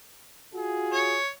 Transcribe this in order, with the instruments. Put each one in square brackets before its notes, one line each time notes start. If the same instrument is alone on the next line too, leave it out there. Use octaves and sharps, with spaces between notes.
[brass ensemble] F4 F#4 G#4
[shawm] C#5